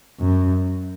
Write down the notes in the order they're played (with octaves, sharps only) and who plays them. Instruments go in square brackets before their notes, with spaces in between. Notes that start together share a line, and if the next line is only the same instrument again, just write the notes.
[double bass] F#2